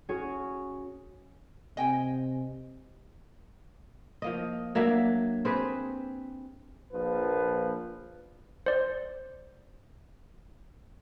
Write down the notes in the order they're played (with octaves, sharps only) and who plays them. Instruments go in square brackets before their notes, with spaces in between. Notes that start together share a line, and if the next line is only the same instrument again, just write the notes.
[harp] C#4 F#4 G#4
[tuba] C3 [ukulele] D#5 G5 G#5
[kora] F3 A#3 D#5
F#3 A#3 D4 E5
C4 G4 G#4 B4
[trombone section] A#1 A#2 F3 B4
[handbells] C5 D5